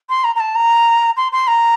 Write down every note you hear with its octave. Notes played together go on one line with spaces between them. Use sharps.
C6
A#5
A#5
A5
A#5
C6
C6
A#5